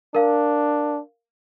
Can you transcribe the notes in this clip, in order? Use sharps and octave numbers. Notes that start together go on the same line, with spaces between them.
D4 A#4 F5